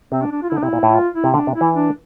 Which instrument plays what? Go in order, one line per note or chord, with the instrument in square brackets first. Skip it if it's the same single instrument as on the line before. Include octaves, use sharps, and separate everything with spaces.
[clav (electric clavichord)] C3 [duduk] C4
[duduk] D4
D4
F4
E4
[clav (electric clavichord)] D3
[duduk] D4
[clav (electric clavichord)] C3 [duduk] E4
[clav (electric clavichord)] A#2
A2
[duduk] E4
F4
E4
[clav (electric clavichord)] C3
[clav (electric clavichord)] D3 [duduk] D4
[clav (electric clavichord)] C3
[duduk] E4
[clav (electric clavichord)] E3
[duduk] D4